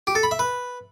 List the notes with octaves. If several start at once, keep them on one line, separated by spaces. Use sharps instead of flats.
G4
A4
B5
E5
B4